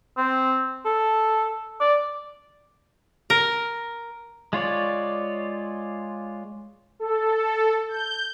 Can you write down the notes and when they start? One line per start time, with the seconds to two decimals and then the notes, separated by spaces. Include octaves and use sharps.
0.17 C4
0.86 A4
1.81 D5
3.30 A#4
4.53 G#3 F4 C#5 D5
7.00 A4
7.89 G6